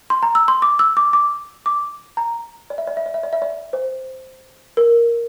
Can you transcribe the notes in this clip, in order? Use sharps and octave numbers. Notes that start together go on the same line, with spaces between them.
C6
A#5
E6
C6
D6
E6
D6
D6
D6
A#5
D5
E5
D5
E5
D5
E5
D5
E5
D5
C5
A#4